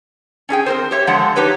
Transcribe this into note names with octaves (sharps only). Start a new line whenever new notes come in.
C#4 D4 G#4 G5
C4 A#4 C5
G4 C#5 E5
D3 F3 G#3 F#5 A5
D4 D#4 G4 B4 C#5